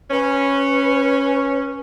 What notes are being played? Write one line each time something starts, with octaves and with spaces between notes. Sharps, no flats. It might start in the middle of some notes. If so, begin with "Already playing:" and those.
C#4 B4